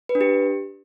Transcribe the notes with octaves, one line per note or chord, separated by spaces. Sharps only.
B4
D4
G4